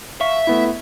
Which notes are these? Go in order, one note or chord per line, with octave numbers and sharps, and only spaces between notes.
E5 F5 C#6
A3 B3 E4